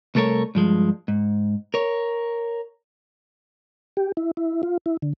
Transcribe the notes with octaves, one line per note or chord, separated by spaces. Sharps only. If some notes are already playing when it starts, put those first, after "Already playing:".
C2 A3 A4 A#4 C#5
G2 F3 G#3
G#2
A#4 C#5
G4
E4
E4
F4
E4
D3